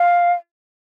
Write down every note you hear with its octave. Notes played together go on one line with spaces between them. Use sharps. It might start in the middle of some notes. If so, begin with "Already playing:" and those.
Already playing: F5